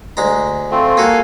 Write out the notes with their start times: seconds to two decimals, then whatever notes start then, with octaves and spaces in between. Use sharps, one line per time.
0.17 D2 G#3 A#5
0.71 A3 C4 F4
0.97 A#3 F#4 A4 F5 G#5